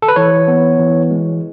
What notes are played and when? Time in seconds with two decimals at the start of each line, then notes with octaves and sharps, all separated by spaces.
0.02 A4
0.08 B4
0.16 E3 C#5
0.48 B3
0.79 E3
1.11 G#3